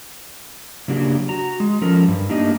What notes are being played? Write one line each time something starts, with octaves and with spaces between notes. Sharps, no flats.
C#3 F#3 A#3 D4 F#4 G4
F#4 A#5
G#3
F3 C#4 A4 A#4
G2
A3 A#3 D4 D#4 G4 D#5